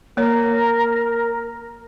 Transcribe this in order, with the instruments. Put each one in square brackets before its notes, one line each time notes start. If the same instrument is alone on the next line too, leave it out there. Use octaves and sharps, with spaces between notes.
[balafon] A#3 C#5 [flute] A#4